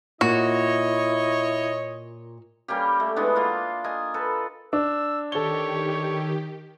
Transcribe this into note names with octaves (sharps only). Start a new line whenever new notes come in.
A#2 E4 F#4 C#5 D#5
G3 A#3 C#4 G4
A3
E3 G#3 B3 D4
A#3 F4
A#4 D#5 G#5
A4 B4
D4 E6
D#3 G4 A4 C#5 G7